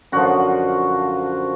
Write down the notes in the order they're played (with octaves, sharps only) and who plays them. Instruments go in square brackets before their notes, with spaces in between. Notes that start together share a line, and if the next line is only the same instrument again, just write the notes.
[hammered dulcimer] F#2 D3 F3 F#4